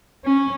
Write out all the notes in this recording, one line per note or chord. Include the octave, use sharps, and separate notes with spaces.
C#4